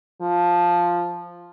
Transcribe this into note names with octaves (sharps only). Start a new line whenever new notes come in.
F3